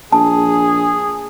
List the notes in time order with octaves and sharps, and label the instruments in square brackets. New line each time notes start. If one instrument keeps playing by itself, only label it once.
[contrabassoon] A#1 [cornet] G#4 [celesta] A5